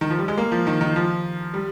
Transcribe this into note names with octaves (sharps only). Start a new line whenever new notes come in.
D#3
F3
G3
G#3
A#3
F3
D#3
D#3
F3
G3